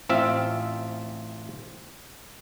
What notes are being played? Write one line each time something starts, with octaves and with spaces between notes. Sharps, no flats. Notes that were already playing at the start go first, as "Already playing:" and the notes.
A1 C4 F4 E5